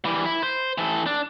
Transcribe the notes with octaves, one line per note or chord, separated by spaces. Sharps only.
E3 G3
E4
C5
E3 A4
D4